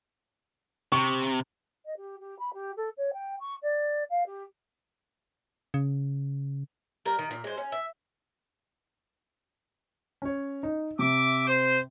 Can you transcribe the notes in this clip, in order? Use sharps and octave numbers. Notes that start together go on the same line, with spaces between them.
C3 C#6
D#5
G4
G4
B5
G4
A4
C#5
G5
C#6
D5
F5
G4
C#3
G3 A#4
D#3
A#2
G#3 C5
C#4
E5
C#4 C#5
D#4
C3 E5 D6
C5